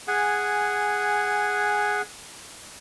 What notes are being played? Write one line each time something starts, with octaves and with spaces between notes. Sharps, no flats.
G#4 F#5 G#5